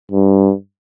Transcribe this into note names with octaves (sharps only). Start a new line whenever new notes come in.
G2